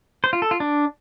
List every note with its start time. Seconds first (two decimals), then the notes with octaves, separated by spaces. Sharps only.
0.24 C5
0.33 F4
0.42 A4
0.51 F4
0.60 D4